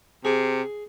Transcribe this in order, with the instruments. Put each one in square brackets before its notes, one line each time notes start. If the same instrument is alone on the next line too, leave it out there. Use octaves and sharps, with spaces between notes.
[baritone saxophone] C3 [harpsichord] G#4